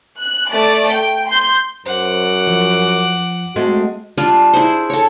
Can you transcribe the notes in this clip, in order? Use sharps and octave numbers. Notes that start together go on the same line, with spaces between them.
F#6
A3 D5
G5
C6 G6
F#2 C5 F#5 D6
F3
G#3 A3 C4 F#4
G3 D4 F4
E4 G#4 C5
A4 C#5